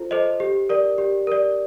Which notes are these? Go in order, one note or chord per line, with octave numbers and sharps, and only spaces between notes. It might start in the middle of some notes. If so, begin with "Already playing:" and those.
Already playing: F4 A4 C5
A4 C5 D#5
G4
A#4 D5
G4
A#4 D5